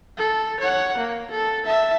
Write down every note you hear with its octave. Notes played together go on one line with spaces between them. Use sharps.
A4
C#5 F#5
A#3
A4
E5 A5